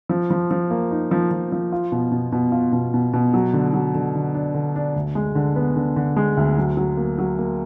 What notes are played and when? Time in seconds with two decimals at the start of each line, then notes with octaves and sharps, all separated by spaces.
0.09 F3
0.30 F3
0.51 F3
0.71 A#3
0.91 D#4
1.11 F3
1.31 F3
1.52 F3
1.72 F4
1.92 B2
2.12 B2
2.32 B2
2.52 F4
2.72 B2
2.94 B2
3.13 B2
3.34 F#3
3.53 D3
3.73 F#3
3.95 D3
4.15 D3
4.34 D4
4.54 D3
4.76 D4
4.96 D2
5.15 G#3
5.35 D3
5.56 B3
5.76 D3
5.96 D3
6.16 G#3
6.37 D2
6.57 F#3
6.77 F#3
6.97 A#3
7.18 F#3
7.39 A#3